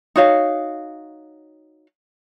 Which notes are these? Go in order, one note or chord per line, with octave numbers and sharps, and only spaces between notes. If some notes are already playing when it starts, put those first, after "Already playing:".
D#4 F#4 C#5 F5